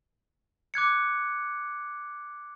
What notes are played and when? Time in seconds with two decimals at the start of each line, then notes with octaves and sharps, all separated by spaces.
0.74 D6 F#6 G#6 C#7